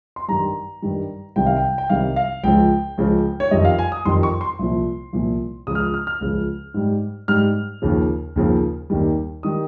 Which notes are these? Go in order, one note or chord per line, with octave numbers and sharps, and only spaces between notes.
C6
G2 D#3 G3 A#5
G2 D#3 G3
C2 C3 D#3 G3 G5
F5
G5
G5
C2 C3 D#3 G3 F5
F5
C#2 C#3 F3 G5
C#2 C#3 F3
C#5
F2 D#3 G3 D#5
F5
G#5
D#6
F2 D#3 G3 C6
C#6
C6
C2 A#2 F3
C2 A#2 F3
C#2 C#3 F3 D#6
F6
D#6
F6
F6
C#2 C#3 F3
G#2 G3
G#2 G3 F6
D#2 C#3 F3
D#2 C#3 F3
D#2 D#3 G3
D#3 G3 D#6